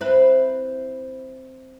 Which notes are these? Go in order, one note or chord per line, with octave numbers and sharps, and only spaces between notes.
C4 E4 B4